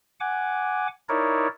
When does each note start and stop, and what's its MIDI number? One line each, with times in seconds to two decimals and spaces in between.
0.20 0.88 78
0.20 0.88 80
0.20 0.88 86
1.09 1.48 63
1.09 1.48 64
1.09 1.48 70
1.09 1.48 73
1.09 1.48 74